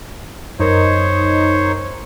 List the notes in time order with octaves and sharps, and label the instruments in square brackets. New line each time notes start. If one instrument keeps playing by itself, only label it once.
[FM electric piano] F#2 A#4 G#6 [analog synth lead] D#4 [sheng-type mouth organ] C5 C#5